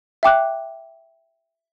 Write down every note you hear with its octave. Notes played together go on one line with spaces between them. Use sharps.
E5 G5 D6 F#6